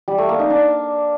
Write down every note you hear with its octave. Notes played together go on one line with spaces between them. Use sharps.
G3
A3
A#3
D#4
D4